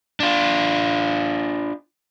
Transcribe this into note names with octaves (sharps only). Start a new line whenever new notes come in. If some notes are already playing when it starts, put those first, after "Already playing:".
D4 F4